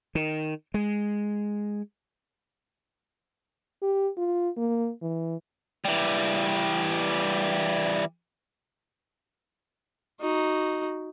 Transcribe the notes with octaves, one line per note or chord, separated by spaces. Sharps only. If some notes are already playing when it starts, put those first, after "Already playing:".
D#3
G#3
G4
F4
A#3
E3
E3 G3
D#4 F#4